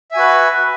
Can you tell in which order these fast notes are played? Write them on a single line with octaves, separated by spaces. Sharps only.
E5 G#5 F#4 B4